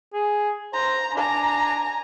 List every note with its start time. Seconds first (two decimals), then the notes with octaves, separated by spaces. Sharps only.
0.14 G#4
0.73 C5 A#5
1.15 D4 G#5 A#5